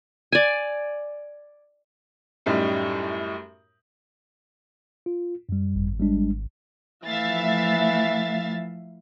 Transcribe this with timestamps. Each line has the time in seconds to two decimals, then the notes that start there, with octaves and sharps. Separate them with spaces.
0.32 D5 G#5
2.46 F#2 A2 G3 D#4
5.06 F4
5.49 F#2 G3
5.75 G#1
6.00 G3 G#3 D4
7.06 E3 F3 A3 E5 F5 A6